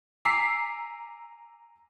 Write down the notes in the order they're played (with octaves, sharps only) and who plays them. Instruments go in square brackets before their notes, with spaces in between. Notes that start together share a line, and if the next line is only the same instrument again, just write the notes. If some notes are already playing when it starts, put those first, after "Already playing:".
[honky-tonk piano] G#5 A#5 D6 E6 B6 C7